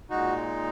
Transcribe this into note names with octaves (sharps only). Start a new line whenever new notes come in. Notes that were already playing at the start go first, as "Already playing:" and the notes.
A#2 G#3 D#4 F#4